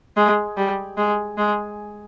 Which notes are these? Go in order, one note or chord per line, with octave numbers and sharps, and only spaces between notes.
G#3
G3
G#3
G#3